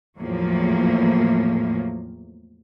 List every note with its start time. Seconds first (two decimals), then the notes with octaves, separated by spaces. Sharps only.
0.19 E2 A2 F3 F#3 A#3